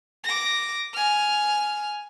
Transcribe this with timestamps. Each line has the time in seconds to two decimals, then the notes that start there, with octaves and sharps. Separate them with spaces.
0.24 D6 A#6
0.94 G#5 F6